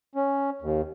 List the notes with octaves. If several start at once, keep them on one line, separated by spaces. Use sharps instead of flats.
C#4
D#2